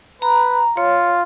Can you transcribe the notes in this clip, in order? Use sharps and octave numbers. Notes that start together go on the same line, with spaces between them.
B4 A#5
F4 C#5